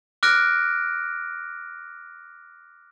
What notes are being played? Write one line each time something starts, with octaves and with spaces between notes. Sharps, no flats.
D6 F6 F#6 A#6 D7